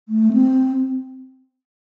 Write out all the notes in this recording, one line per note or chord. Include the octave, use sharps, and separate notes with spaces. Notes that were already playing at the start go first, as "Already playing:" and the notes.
A3
C4